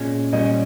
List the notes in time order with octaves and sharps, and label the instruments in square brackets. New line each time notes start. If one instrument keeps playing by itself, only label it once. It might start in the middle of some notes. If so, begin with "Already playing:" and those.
Already playing: [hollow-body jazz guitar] A#2 G#3 C#4
[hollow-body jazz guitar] A#2 G3 C#4 [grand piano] D#5